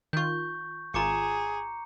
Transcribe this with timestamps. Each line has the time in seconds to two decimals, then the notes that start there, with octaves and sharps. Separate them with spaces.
0.13 D#3 F4 C#6 G6
0.94 G#1 F4 G#4 A#5 D6 C#7